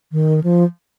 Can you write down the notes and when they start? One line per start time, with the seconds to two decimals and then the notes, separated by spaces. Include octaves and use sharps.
0.12 D#3
0.44 F3